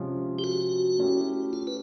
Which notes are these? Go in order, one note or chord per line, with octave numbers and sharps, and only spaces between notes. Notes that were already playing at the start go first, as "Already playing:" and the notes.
Already playing: C3 F3 G#3 C#4
G4
F#4
A3 C#4 E4 G4
F4
B4